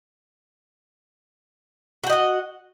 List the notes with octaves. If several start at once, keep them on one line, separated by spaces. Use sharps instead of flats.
F#4 D#5 F#5 G5